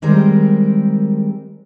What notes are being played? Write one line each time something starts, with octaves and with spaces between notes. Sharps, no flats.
D#3 G3 G#3 C4 A#4